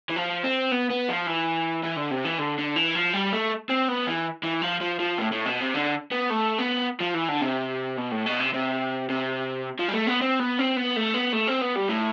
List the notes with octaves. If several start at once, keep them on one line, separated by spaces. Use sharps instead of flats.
E3
F3
C4
B3
B3
F3
E3
E3
D3
C3
E3
D3
D3
E3
F3
G3
A3
C4
B3
E3
E3
F3
F3
F3
A2
A2
B2
C3
D3
B3
A3
B3
F3
E3
D3
C3
B2
A2
B2
C3
C3
C3
F3
G3
A3
B3
C4
B3
C4
B3
A3
B3
A3
C4
B3
G3
A2